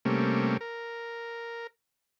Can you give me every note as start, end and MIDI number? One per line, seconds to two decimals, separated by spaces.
0.05 0.57 48
0.05 0.57 55
0.05 0.57 57
0.05 0.57 58
0.05 0.57 61
0.61 1.67 70